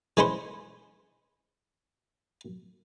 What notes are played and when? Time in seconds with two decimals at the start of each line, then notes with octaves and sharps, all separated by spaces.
0.17 E3 G#3 C#4 B4 C5